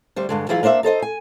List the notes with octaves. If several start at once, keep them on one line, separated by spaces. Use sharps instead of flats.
D2 G3 C5
G2 D3 G#3
E3 F#3 E4 F4 G#4
A#3 D4 C5 D#5 E5
D#4 A4 C5 D#5
G#5